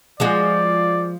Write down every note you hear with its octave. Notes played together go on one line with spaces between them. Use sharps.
F3 G#3 F#4 D5